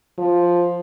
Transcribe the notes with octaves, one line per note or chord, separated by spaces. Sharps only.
F3